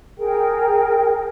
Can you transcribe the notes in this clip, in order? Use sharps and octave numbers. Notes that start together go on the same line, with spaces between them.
G#4 A#4 G5